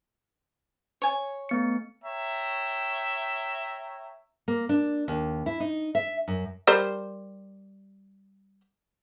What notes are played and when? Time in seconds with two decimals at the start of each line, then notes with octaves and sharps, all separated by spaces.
1.02 C#5 G#5
1.49 A3 B3 C#7
2.04 C#5 E5 G5 A#5
4.48 A#3
4.69 D4
5.08 D#2
5.46 E4
5.60 D#4
5.95 E5
6.28 F#2
6.67 G3 A#4 C5